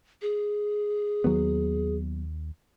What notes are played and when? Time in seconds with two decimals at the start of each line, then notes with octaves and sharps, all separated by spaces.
0.22 G#4
1.24 D#2 F#3 B3